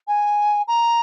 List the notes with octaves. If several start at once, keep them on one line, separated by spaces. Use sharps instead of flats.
G#5
A#5